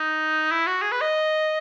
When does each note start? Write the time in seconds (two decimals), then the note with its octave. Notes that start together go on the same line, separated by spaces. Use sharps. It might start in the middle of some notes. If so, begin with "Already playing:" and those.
Already playing: D#4
0.51 E4
0.67 F#4
0.82 G#4
0.92 B4
1.01 D#5